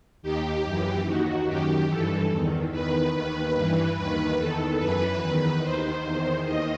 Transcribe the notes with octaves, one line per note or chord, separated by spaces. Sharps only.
D#2 D#3 G4
F#2 E3
D#2 D#3 F#4
F#2 D#3 G4
G2 E3 A4
E2 D#3
E2 D#3 B4
D#2 D#3 B4
G2 E3
D#2 D#3 B4
E2 D#3 A4
F#2 E3 B4
E2 D#3
D#2 D#3 C5
E2 D#3
D#2 D#3 D#5